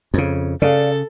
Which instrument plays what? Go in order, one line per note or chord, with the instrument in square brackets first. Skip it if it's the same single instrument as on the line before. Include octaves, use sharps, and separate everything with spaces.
[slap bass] F2 C#3
[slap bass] C#3 [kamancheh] A4 [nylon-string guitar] D5 F5